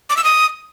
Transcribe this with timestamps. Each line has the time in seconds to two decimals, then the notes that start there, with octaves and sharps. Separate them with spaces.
0.10 D6
0.17 E6
0.24 D#6